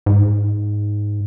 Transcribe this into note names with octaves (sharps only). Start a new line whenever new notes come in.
G#2